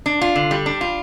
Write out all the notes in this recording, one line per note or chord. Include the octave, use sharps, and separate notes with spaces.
D4
F4
D3
G3
D4
F4